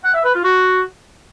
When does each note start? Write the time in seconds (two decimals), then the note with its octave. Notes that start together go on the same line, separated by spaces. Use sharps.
0.04 F#5
0.14 E5
0.24 B4
0.34 F4
0.44 F#4